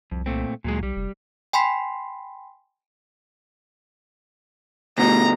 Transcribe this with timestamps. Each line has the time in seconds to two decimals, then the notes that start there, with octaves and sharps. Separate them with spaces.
0.11 C2 F2
0.26 A#2 A3 C4
0.64 D2 A#2 F#3 G#3
0.83 B1 G3
0.96 F1
1.53 G5 G#5 B5 C6 B6 C7
4.98 D2 B2 A#5